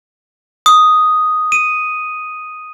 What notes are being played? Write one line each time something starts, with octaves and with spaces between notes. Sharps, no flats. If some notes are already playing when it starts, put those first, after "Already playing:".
D#6
D#7